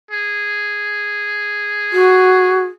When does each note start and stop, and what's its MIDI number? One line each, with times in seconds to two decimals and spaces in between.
0.11 2.73 68
1.93 2.63 66